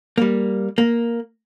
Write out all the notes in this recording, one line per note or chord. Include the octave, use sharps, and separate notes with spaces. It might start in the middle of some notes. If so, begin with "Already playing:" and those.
G3 A#3
A#3